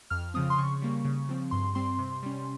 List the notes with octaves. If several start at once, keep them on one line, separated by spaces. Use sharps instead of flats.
F2 F6
C#3 F3 C4 D#6
C6
C#3 C#6
G3 A#3
C#3
F3 C4
G2 C6
G3 C4 C6
C3
G3 C#4